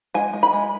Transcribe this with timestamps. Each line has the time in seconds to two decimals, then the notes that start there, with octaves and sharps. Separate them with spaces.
0.14 G#3 G#5
0.33 G#3
0.43 B5
0.53 G#3